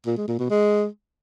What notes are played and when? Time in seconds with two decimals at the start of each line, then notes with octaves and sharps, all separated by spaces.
0.06 A#2
0.17 G#3
0.28 A#2
0.39 B2
0.50 G#3